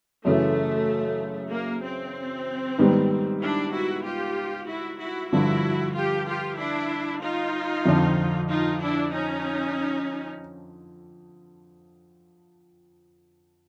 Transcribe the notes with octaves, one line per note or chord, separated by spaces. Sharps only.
F#2 C#3 E3 A3
A#3
C4
G#2 D#3 G3 B3
D4 E4
E4 F#4
F4 G4
E4 F#4
E4 F#4
G2 D3 F3 E4 F#4
F4 G4
F4 G4
D4 E4
D#4 F4
F2 D3 F3
D#4 F4
D4 E4
C#4 D#4